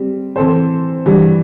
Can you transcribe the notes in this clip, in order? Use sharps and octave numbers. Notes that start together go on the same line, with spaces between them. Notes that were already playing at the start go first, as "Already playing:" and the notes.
Already playing: G3 C4
E3 C4 A4 C5
G2 E3 G3